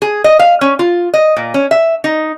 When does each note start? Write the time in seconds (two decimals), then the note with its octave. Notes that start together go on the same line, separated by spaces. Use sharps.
0.02 G#4
0.24 D#5
0.39 F5
0.61 C#4
0.79 F4
1.14 D#5
1.36 A#2
1.54 C#4
1.71 E5
2.04 D#4